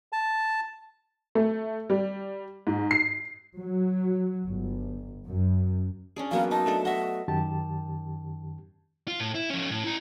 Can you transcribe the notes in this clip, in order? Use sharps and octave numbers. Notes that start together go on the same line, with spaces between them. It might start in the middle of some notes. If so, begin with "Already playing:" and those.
A5
A3
G3
G#2
C7
F#3
G1
F#2
C#4 D4 G#4
F#3 A#3 B3 F5
D#4 A5
A3 D4 A4
D#5 E5 F#5
F#2 D#3 G4 A5
F4
A2
E4
F3 C#4
A2
E4 A#5